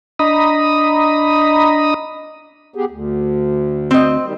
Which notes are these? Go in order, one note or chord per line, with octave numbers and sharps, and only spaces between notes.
D4 D#5 A#5 B5 D#6
B3 G4 G#4
D2
C4 D#5
D#3 G3